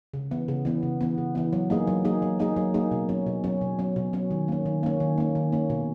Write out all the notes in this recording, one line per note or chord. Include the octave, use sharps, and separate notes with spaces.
C#3
E3 B3
C#3
E3 B3
C#3
E3 B3
C#3
E3 B3
F#3
A#3 D#4 G#4
F#3
A#3 D#4 G#4
F#3
A#3 D#4 G#4
F#3
A#3 D#4 G#4
B2
F#3 C#4
B2
F#3 C#4
B2
F#3 C#4
B2
F#3 C#4
D#3
A#3 C#4
D#3
A#3 C#4
D#3
A#3 C#4
D#3
A#3 C#4
B2